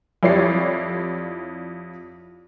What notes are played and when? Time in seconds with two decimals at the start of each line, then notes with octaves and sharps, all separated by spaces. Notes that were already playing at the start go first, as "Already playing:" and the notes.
0.23 F2 E4 G4 C#5 D5 C7